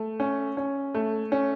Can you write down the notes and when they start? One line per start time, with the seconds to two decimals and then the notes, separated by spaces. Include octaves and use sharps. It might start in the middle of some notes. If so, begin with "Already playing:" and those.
Already playing: A3
0.20 C#4
0.57 C#4
0.95 A3
1.32 C#4